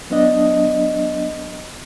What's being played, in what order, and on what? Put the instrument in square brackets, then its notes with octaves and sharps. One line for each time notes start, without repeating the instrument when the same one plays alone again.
[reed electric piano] F#3 B3 D4 D#5